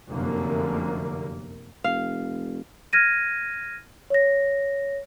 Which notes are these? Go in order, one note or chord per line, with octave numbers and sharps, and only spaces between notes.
F1 F#2 D3 A#3
F1 F5
F6 G#6 A#6 D#7
C#5 A#6